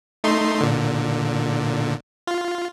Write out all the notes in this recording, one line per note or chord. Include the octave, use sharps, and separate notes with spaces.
A3 D#4 C6
A#2 D3
F4